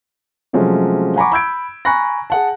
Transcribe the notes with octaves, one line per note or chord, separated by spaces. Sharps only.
C3 F3 F#3 G#3 A3 C#4
F#5 G#5 A#5 B5 C#6 D6
B5 E6 G6 G#6 D7
G#5 A#5 B5 C#6 F#6 A#6
G#4 F#5 A5